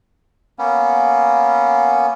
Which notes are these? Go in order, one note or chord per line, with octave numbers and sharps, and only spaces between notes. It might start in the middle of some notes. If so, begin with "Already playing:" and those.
A#3 B3 C#4